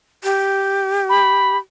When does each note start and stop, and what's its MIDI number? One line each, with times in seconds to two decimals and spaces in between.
0.24 1.56 67
1.09 1.57 83